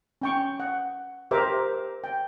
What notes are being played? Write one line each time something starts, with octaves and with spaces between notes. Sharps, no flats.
C#4 G5 C#6
F#5
G4 A#4 C5 E5 D6
G5